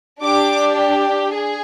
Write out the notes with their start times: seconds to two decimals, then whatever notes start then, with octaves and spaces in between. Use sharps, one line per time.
0.22 D4 G4 D6
1.34 G#4